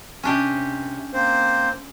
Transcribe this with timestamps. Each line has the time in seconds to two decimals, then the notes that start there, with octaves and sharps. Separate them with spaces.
0.23 C3 C#4 D4 G4
1.13 A#3 C4 C5